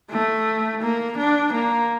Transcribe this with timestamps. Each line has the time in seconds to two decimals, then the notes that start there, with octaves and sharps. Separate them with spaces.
0.10 A3
0.82 A#3
1.18 D4
1.53 A#3